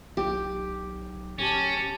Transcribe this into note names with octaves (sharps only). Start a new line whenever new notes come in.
B1 G4
D1 C#4 G4 A5